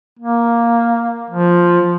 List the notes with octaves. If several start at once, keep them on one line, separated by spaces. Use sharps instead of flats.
A#3
F3